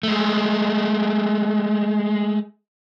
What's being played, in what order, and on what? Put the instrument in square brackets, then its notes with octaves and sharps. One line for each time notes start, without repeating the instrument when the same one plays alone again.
[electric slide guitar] G#3 A3